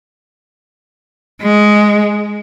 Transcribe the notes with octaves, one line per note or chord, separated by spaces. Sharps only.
G#3